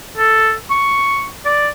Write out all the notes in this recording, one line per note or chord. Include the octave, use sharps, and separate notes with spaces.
A4
C#6
D5